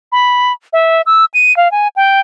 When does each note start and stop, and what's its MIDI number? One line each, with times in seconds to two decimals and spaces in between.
0.12 0.53 83
0.73 1.02 76
1.06 1.25 88
1.34 1.55 99
1.57 1.71 77
1.71 1.88 80
1.96 2.20 79